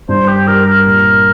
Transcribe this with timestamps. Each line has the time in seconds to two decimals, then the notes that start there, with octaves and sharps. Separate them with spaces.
0.09 G2 C5
0.28 G4
0.47 G3 A#4
0.66 A#4
0.86 A#2